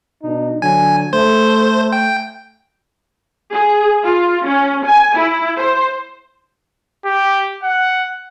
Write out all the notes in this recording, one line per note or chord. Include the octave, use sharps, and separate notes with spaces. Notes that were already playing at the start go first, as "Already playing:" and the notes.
B2 D4 D#4
D3 F#3 G#5
A3 C5
G5
G#4
F4
C#4
G#5
E4
C5
G4
F#5